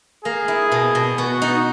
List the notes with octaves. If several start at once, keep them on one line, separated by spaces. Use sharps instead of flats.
A#3 G#4
E4
B2
B2
B3 F#4
D#4